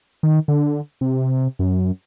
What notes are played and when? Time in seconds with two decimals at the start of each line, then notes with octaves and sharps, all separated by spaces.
0.23 D#3
0.48 D3
1.01 C3
1.59 F#2